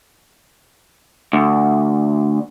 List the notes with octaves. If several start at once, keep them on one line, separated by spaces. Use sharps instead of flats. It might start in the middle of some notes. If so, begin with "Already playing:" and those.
D2